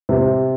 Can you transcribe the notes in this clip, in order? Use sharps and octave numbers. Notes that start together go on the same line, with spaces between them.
C3